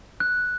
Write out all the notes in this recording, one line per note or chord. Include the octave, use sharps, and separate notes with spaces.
F#6